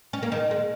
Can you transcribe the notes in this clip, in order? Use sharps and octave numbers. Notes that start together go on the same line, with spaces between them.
C#4
A#3
D#3
G#3